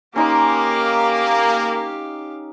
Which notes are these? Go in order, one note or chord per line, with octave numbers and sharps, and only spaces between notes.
A#3 C#4 D#4 G4 F5 C6